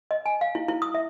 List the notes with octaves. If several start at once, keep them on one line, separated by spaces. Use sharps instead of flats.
D#5
G#5
F5
E4
E4
D#6
E5